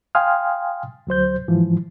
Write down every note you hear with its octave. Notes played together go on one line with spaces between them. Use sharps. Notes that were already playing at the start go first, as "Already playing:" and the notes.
F5 G5 G#5 C6 D#6 F6
D2 F#3 C5 G6
G#2 E3 F3